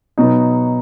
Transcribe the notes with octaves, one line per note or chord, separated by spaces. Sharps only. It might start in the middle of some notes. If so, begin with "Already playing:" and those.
B2 F#3 B3 D#4